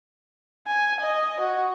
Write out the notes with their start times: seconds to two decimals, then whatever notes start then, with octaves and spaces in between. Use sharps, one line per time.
0.67 G#5
1.00 D#5
1.40 F#4